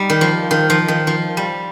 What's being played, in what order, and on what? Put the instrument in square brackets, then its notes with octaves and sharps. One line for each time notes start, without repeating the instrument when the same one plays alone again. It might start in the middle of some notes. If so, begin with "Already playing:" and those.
Already playing: [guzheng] G3 D#4
D#3
F3
D#3
F3
D#3
F3
G3